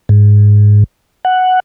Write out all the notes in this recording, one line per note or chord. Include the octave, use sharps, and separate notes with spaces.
G#2
F#5